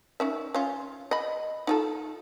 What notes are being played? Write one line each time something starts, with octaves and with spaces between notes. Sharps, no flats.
D#3 C#4 E5
C#4 F4
D#5 B5
D#4 F4 A4